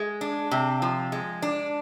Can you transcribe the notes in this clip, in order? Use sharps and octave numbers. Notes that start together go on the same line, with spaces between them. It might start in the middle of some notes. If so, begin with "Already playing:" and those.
Already playing: G#3
D4
C3
F3
G#3
D4